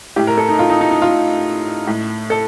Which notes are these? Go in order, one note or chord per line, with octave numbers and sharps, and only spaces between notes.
A2 G4
A#4
A4
D#4
F4
D#4
D#4
D#4
F4
A2
A4